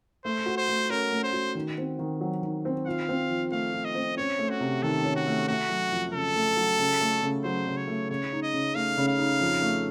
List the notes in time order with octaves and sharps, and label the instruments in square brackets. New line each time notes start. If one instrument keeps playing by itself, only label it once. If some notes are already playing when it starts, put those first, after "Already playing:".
[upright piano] A3 [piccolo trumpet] C5
[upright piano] F#4
[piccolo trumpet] C5
[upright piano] A3
[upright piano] C#4 [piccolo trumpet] A#4
[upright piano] A3
[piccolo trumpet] C5
[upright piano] F#4
D#3
C4
D#3
F#3
D#3
C4
[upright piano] F4 [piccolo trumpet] F5
[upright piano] C4
F3
[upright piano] A3 [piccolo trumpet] F5
[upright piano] F4
[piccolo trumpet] D#5
[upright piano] C4
[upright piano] C#4 [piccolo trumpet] C#5
[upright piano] A3
[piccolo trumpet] F#4
[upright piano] C3
[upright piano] D#3 [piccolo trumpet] A4
[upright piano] C#4
[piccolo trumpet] F#4
[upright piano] A3
[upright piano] A3 [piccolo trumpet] F#4
[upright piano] F#3
F2
[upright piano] C#3 [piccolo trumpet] A4
[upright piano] A3
F#3
C#3
A3
C#3
[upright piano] F#3 [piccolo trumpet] C5
[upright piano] C#3
[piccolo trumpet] C#5
[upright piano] A3
[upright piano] C#3 [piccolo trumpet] C#5
[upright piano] D#4
[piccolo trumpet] D#5
[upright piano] C#3
[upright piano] A3 [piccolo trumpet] F5
[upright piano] C#3
[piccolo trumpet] F5
[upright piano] D#4
F2
A3